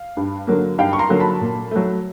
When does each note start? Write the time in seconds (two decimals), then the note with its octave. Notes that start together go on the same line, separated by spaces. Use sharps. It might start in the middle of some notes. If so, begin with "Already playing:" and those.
Already playing: F5
0.17 G2
0.47 D3 F#3 A#3
0.78 G2 F5 G5
0.93 C#6
0.99 A#5 C6
1.09 D3 F#3 A#3
1.20 A5 B5
1.41 A#2
1.71 F#3 A3